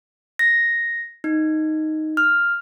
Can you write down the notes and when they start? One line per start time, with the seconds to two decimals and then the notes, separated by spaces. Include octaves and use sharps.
0.39 A#6
1.24 D#4
2.17 F6